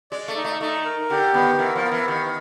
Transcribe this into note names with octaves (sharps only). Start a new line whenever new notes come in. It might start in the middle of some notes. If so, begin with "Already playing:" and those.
G#3 D5
A3
D#4
A3
A3 D#4
A#4
D3 G4
D#3 B3
E3 A#4
F3
B3
E3
D#3 G4